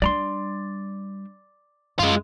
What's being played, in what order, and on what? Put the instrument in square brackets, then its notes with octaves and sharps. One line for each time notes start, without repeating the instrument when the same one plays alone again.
[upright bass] G3 D4 [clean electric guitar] D5 A#5 C6
[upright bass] F#2 [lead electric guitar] G#3 F4